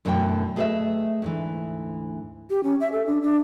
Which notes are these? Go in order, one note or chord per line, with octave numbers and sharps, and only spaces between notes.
F#2 B2 D3 E3 A3 G5
A3 G#4 B4 C#5 D#5 E5
D2 G#2 E3
G4
C#4
E5
A4
D4
D4